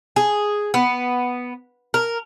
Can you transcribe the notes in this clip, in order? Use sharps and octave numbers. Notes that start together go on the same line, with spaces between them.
G#4
B3
A#4